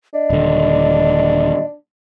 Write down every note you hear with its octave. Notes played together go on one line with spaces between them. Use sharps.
D4 D#5
D#1 D3